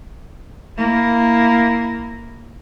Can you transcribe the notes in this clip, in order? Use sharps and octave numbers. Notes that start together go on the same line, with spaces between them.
A#3 E4